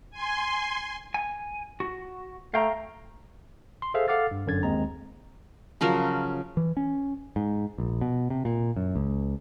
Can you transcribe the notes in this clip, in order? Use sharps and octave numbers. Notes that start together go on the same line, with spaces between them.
G#5 C6
G#5
F#4
A3 F5 G5 A#5
C6
G#4 A4 C5 E5 F5
A4 F5 F#5 D6 F6 A6
G2
G1 F#2 D3 G#6 A6
D#2 G#3 C4 A#5
C#3 F3 F#3 A#4
E3
C#4
G#2
A#1
B2
C3
A#2
F#2
C#2